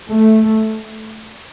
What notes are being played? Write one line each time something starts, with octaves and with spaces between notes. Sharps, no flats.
A3